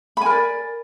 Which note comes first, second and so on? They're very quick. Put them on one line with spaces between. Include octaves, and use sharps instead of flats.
B5 G#5 A#4 D5